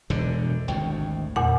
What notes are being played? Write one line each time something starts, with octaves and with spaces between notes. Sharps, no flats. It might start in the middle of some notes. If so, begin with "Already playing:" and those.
E1 F#2 D3
G#1 D2 A2 G5
E2 A#2 F#5